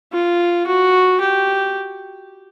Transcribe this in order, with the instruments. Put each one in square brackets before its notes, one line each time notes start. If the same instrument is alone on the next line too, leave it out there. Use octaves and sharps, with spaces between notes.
[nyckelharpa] F4
F#4
G4